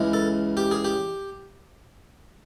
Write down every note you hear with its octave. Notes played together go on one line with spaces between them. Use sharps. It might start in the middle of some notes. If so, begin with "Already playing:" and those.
Already playing: C#2 C#3 E3 G#3
A4
G4
G#4
G4